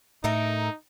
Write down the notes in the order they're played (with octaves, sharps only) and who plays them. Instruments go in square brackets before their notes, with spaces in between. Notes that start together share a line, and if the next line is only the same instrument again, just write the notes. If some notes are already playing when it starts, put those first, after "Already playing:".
[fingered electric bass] A2 [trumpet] D#4 [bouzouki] A4 A#4 E5